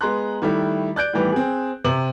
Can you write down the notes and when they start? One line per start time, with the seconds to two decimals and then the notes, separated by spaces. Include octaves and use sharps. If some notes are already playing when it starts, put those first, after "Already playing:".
0.01 G#3 B3 A#5 C6 F#6
0.42 D#3 G3 A3 E4
0.96 D5 F#6 G6 D7
1.13 A2 D#3 E3 G3 B3
1.32 C4 G#4
1.85 C3 F#7